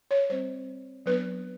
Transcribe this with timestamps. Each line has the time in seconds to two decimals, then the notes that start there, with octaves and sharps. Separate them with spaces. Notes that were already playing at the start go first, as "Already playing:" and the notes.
0.11 C#5
0.30 G3 C4 C5
1.06 F#3 B3 D4 B4